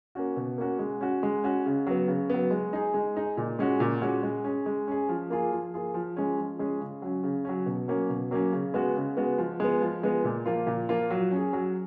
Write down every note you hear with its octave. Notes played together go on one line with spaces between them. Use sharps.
A#3 C#4 F#4
B2
A#3 C#4 F#4
G#3
C#4 F#4
G#3
C#4 F#4
C#3
F#3 B3
C#3
F#3 B3
G#3
D#4 G#4
G#3
D#4 G#4
A#2
G#3 C#4 F#4
A#2
G#3 C#4 F#4
G#3
C#4 G#4
G#3
C#4 G#4
F3
A#3 F4 G#4
F3
A#3 F4 G#4
F3
G#3 C#4 G#4
F3
G#3 C#4 G#4
C#3
F#3 C#4
C#3
F#3 C#4
B2
F#3 A#3 C#4
B2
F#3 A#3 C#4
C#3
G#3 B3 F#4
C#3
G#3 B3 F#4
F3
G#3 B3
F3
G#3 B3
A#2
F3 A#3 F4
A#2
F3 A#3 F4
F#3
C#4 G#4
F#3